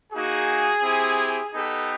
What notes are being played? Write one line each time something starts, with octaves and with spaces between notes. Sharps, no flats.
A#3 D#4 F#4 G#4
C4 E4 G4
B3 D#4 G4 A4